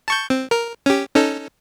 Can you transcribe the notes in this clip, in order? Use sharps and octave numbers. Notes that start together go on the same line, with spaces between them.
A5 C#6 G6
C4
A#4
C#4 G4
C#4 D#4 A4